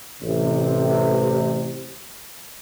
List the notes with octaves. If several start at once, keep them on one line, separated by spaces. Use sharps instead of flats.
A1 C3